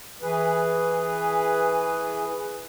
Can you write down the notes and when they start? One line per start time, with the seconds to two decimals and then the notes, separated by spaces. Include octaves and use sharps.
0.22 E3 G#4 B4